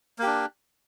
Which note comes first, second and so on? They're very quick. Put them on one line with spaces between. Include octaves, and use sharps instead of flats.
A#3 G4 D4